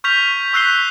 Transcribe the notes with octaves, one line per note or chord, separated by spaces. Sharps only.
C#6 F6 G6 B6 F7
C#6 E6 F#6 B6 C7 G7